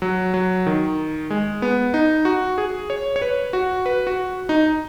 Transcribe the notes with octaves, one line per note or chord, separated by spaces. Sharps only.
F#3
F#3
D#3
G#3
B3
D#4
F#4
G#4
C#5
C#5
B4
F#4
B4
F#4
D#4